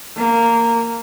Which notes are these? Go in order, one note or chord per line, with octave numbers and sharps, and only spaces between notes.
A#3